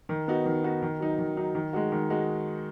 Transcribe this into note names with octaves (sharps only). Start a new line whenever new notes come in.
D#3
B3 D#4 F#4
D#3
B3 D#4 F#4
D#3
F#3 D#4
D#3
F#3 D#4
D#3
G#3 D#4 F#4
D#3
G#3 D#4 F#4